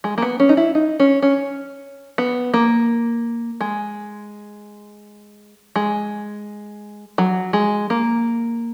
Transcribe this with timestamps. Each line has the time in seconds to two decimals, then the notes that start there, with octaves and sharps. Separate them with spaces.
0.04 G#3
0.18 A#3
0.22 B3
0.40 C#4
0.49 D#4
0.57 E4
0.75 D#4
1.00 C#4
1.22 C#4
2.18 B3
2.54 A#3
3.61 G#3
5.76 G#3
7.18 F#3
7.53 G#3
7.90 A#3